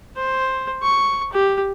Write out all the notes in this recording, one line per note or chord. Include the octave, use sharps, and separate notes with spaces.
C5
C#6
G4